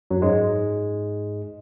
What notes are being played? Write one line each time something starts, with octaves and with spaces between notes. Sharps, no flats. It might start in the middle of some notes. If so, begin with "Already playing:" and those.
F#2 F#3
G#2 G#3